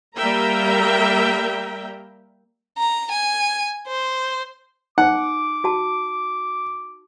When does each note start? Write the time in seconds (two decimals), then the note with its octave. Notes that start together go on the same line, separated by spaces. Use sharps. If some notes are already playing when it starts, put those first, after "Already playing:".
0.17 G3 A#3 A#4 E5 G5 A#5
2.78 A#5
3.11 G#5
3.87 C5
4.98 D#4 F#5 D6
5.64 F#4 A5